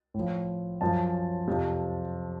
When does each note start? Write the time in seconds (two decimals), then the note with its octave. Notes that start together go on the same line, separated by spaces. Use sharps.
0.14 A2
0.19 F3
0.81 F#2 F3 A5
1.47 F2 C3 F3